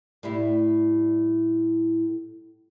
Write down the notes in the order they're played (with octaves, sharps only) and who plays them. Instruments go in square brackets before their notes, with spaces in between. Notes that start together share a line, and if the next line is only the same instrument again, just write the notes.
[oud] A2 G3 E4